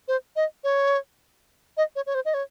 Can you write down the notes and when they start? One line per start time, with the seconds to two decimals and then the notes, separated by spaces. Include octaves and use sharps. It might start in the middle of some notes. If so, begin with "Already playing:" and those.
0.08 C5
0.36 D#5
0.64 C#5
1.77 D#5
1.96 C#5
2.06 C#5
2.15 C5
2.25 D#5
2.34 C#5